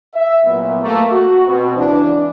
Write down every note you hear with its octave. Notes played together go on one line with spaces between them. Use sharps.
E5
C2 A#2 F#3 B3
A3 A#3
F#4
B2 C4
C#2 E3 D4